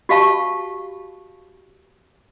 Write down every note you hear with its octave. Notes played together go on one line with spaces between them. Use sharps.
F#4 G4 F5 A5 C#6